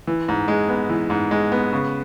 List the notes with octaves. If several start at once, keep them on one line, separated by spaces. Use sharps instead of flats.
E3
G#2
G#3
B3
E3
G#2
G#3
B3
C#3